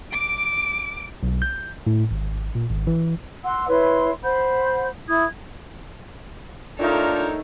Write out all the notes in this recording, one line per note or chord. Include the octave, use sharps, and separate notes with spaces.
D6 D7
B1
G6
A2
G#1
A#2
G#1
E3
F#5 C6 E6
E4 B4 C#5 C6
C5 F#5 B5 G6
E4 D#6 G#6
D#3 A3 D4 D#4 F4 A4 A#4 C#5